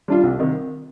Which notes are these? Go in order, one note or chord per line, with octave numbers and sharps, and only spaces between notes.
G3 D4 F4
C2
C3 D#3